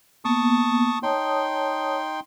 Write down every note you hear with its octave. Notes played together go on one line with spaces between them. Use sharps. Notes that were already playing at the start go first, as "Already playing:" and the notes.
A#3 B3 A5 C#6 D#6
D#4 C#5 G5 A5 C6 D#6